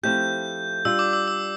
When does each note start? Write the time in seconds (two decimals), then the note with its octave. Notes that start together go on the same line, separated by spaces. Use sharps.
0.03 F3 A3 C4 E4 G4 G6
0.85 G3 D4 F4 E6
0.99 D6
1.13 E6
1.28 E6